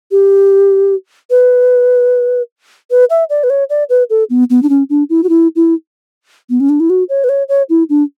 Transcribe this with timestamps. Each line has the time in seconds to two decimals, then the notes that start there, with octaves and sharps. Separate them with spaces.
0.11 G4
1.30 B4
2.91 B4
3.10 E5
3.30 D5
3.44 B4
3.50 C#5
3.70 D5
3.90 B4
4.10 A4
4.30 B3
4.50 B3
4.63 D4
4.69 C#4
4.90 D4
5.10 E4
5.24 F#4
5.29 E4
5.56 E4
6.50 B3
6.60 C#4
6.69 D4
6.80 E4
6.90 F#4
7.09 C#5
7.24 B4
7.29 C#5
7.49 C#5
7.70 E4
7.90 D4